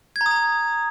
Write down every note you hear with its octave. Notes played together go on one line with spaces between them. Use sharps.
G#6
A#5
D#6
A#5
D#6